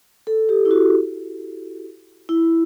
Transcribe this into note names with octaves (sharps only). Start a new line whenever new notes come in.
A4
G4
E4
F#4
E4